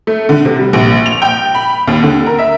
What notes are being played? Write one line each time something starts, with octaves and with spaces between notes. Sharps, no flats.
A3
D3
C3
G3
A#1
F7
G5
B5
D#2
D3
A#4
E5